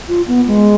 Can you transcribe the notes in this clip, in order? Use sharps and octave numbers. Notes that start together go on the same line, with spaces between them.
F4
B3
G#3